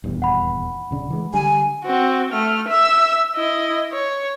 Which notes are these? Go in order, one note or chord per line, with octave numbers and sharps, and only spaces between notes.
D#1 E2 G2
F#5 B5
D#1 C#3 D4
E3 G#3
D3 G3 G#5
C4 F#4
A3 F6
E5 E6
E4 D#5
C#5